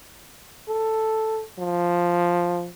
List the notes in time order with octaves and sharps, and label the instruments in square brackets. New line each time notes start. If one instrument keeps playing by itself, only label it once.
[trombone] A4
F3